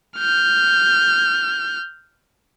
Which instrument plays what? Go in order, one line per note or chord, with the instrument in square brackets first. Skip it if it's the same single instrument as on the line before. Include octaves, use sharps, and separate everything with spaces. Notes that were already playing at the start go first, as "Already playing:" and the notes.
[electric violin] F6 G6